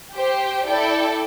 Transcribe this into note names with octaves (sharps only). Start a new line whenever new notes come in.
G4 C5 G5
E4 A4 D5 G5